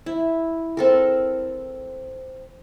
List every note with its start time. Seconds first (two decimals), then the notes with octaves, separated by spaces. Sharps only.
0.06 E4
0.77 C4 A4 A#4